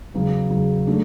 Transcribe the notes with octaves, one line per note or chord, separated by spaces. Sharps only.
E2 C#3 F#3
E2 C#3 F#3
F#3 A3 D4